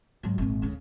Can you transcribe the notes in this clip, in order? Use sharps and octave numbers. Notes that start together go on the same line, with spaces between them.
G#2 F#3
G#1 A#2
D2 C#3